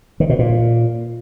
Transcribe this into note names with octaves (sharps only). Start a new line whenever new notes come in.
D#3
B2
A#2